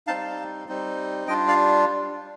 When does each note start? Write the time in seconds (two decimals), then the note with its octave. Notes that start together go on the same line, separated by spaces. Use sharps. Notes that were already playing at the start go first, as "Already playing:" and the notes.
0.07 G3 C4 D#4 F5 A5
0.68 G3 C4 D#4
1.28 G3 D4 F4 D#5 G5
1.48 D5 F5